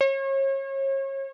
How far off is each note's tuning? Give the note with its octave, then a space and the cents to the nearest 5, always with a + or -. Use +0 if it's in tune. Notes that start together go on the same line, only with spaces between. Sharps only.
C#5 -35